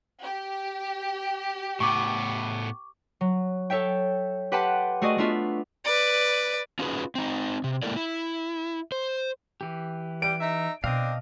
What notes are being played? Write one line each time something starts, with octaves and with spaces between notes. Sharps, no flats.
G4
A2 B3 C#6 D6
F#3
A4 C#5 E5 G5
G4 B4 F#5 G5 A5 C6
A3 F#4 G#4 D5 D#5
A3 B3 D4 F4 E5
B4 D5
C#4 D#4 F4 F#4 G#4 B4
C4 D#4
C3
G#3 A#3 E4 A4 A#4 D5
E4
C5
E3 G4
G3 D7
D#4 E5
B2 C4 D4 D#5 F5